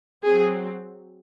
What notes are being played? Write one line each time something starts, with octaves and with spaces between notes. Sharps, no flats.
F#3 C4 G#4